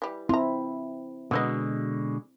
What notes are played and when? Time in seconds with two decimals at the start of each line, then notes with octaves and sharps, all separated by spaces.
0.02 E3 G3
0.29 C4 E4 F4 A#5
1.31 B2 D3 F#3 G#3 B4 D#5